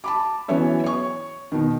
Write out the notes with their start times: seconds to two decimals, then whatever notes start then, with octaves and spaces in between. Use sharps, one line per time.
0.04 A5 B5 D6
0.48 E3 F#3 B3 C#4 C#5 E5
0.84 C#5 C#6
1.52 B2 D#3